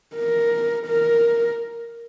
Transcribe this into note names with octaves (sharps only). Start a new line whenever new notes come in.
A#4
A#4